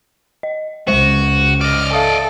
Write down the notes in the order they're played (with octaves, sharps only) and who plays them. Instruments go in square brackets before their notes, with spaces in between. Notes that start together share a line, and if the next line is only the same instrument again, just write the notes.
[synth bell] D#5
[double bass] C#2 [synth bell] G#3 C5 [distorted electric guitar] F#4
[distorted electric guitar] D5 D#5 [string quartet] F6
[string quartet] A4 [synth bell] E5 F5 D#6